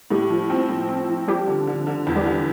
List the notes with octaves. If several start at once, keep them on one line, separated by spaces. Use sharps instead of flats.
A2 G3 G4
F3
C4
A2
C4
F3
F3 G3 G4
D3
D3
D3
E2
G3 G4
D3